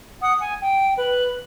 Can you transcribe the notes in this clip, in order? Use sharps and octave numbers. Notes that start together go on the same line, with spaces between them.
F#5 D#6
G#5
G5
B4